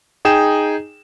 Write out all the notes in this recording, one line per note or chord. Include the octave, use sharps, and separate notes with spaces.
D#4 G#4 G5 E7